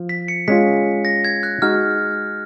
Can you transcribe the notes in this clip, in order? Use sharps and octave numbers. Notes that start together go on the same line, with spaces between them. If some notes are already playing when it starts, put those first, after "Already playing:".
Already playing: F3
B6
C#7
G#3 C#4 F4 B6
A#6
G#6
F#6
G#3 D#4 F#4 F6